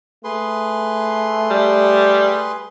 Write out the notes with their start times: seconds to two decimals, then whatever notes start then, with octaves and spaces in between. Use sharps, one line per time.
0.24 A3 G#4 B4 C6
1.50 G3